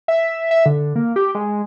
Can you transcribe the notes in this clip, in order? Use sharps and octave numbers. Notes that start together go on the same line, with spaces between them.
E5
E5
D3
A#3
G4
G#3